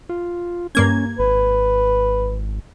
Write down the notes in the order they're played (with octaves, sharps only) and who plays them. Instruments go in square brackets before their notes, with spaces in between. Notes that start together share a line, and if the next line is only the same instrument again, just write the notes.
[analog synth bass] F4
[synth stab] G2 A#3 G#6 [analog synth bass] C#4
[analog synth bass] G#1 [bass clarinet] B4